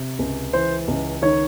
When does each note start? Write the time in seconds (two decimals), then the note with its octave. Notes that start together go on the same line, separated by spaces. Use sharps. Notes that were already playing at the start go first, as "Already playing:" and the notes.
Already playing: C3
0.19 C#2
0.53 E3 C5
0.88 C#2
1.22 D#3 C#5